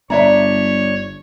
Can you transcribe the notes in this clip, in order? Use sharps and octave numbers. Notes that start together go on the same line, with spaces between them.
G1 D4 B4 C#5 D5 E5 A#5